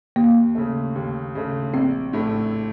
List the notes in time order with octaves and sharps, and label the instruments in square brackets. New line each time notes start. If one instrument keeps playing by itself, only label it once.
[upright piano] D#2 [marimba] A#3
[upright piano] C#3 A3
D#2
C#3 A3
[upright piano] A#1 [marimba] C4
[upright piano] A2 A3